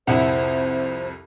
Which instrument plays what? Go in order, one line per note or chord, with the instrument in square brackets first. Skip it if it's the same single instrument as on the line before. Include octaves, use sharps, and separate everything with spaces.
[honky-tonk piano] C2 F2 [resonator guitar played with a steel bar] E4 E5 F#5 [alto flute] C5